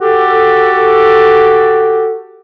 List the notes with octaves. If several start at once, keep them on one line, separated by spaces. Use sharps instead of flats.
F#4 G4 A4